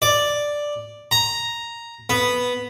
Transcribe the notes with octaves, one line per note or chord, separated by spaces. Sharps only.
D5
A#5
B3